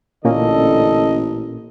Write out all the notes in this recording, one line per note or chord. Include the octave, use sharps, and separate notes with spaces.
A1 A#2 D3 A#3 C#4 A4 D#5